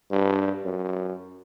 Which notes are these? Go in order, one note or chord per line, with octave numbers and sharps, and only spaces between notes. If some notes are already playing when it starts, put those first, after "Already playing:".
G2
F#2